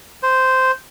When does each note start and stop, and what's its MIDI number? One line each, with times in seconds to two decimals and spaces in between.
0.23 0.71 72